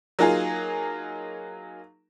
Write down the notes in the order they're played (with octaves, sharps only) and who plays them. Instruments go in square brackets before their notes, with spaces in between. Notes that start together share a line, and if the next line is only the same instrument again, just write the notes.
[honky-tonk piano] F#3 A#3 D#4 F4 G#4